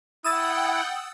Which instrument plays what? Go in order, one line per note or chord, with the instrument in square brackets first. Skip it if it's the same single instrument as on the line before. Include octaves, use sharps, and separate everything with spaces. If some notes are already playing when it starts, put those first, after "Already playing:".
[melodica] E4 [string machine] F#5 G5 [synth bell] D#6 E6 A6